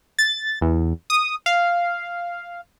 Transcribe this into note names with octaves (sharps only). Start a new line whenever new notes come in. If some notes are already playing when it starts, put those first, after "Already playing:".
A6
E2
D#6
F5